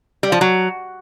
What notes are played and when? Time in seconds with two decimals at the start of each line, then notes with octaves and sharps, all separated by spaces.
0.23 G3
0.32 F3
0.41 F#3